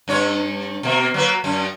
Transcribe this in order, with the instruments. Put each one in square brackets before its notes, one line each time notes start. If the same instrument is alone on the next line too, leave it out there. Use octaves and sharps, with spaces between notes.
[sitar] G2 C#4 C#5
B2 A#3
F#3 A#3 B4
F#2 C#4